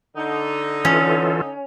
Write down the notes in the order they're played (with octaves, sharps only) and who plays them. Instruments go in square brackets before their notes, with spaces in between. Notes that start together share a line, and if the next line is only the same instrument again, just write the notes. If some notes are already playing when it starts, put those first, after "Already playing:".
[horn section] D3 D#4
[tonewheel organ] E3 F4 A4 [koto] C#4